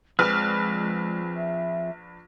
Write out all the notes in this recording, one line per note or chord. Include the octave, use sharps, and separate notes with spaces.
A#1 F3 G#3 C4 G#4 B4 F6
E5